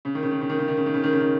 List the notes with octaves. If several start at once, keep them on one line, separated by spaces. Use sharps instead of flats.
C#3
D#3
C#3
D#3
C#3
D#3
C#3
D#3
C#3
D#3
C#3
D#3
C#3
D#3